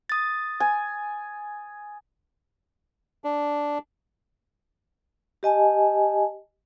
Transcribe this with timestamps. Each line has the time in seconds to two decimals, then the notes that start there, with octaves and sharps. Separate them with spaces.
0.10 D#6 A6
0.60 G#5
3.24 D4
5.43 G4 D#5 G#5 A5